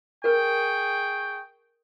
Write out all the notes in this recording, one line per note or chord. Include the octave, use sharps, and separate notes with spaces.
G#4 A#4 B4 G5 C#6